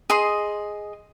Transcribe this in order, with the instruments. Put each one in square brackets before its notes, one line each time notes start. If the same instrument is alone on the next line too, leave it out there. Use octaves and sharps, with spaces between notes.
[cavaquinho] G#4 D#5 C6